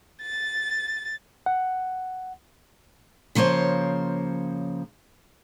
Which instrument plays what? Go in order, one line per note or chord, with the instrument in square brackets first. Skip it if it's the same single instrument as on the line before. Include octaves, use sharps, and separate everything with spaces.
[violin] A6
[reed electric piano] F#5
[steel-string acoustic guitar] C#3 F3 A#3 C5 C#5